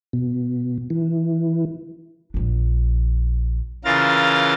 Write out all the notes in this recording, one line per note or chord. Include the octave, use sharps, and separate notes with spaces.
B2
E3
A#1 D4
C#3 E3 F4 A#4 F5 A6